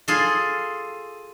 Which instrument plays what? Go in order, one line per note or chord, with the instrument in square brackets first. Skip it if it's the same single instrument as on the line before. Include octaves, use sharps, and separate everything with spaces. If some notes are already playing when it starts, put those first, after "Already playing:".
[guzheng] F4 G#4 A4